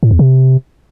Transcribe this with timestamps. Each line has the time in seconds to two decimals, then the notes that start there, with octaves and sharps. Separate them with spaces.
0.03 A2
0.11 E2
0.19 C3